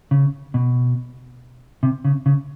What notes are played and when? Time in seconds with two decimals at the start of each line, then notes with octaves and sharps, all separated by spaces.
0.11 C#3
0.54 B2
1.83 C3
2.05 C#3
2.26 C#3